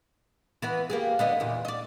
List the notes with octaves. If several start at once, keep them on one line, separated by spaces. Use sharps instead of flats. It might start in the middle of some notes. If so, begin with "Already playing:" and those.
E3 B3 B4
A#3 G4 G#4
D3 B3 D#5
E2 A#2
D5 D#5